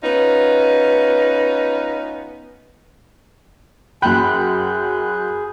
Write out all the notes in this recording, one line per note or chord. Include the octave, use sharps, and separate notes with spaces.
B3 C#4 D#4 F4 B4
F#2 G#4 G5 B5 F#6 G6